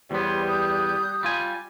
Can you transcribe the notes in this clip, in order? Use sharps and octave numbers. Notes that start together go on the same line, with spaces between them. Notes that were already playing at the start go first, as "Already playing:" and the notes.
E2 G3 B3 C5 C#5 C6
D#6 F#6 G6
G3 F4 G#5